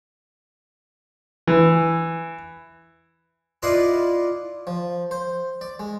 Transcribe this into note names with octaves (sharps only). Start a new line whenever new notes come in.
E3
E4 F4 B4 D5 D#5 C6
F3
C5
D5
G#3